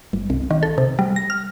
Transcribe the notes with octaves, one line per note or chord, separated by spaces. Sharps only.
G1
C2
D#3
A4
C3
G3
A#6
F6